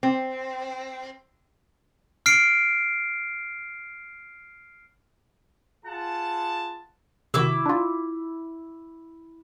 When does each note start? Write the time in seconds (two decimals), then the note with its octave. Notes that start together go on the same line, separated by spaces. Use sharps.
0.03 C4
2.26 F6 C7 D7
5.85 F4 G#4 F#5 A5
7.34 C3 D#3 E4 F#4 D6 E6
7.66 D4 F4